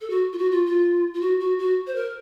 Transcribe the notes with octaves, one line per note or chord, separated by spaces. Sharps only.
A4
F#4
F4
F#4
F4
F4
F4
F#4
F#4
F#4
C5
A#4